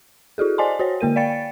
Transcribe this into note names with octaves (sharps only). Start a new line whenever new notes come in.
E4 F#4 G#4 A4
C5 D5 D#5 G#5 A5 C6
F#4 C5 C#5
D3 A#3 A#4 D#7
D5 F5 G5 A6 C#7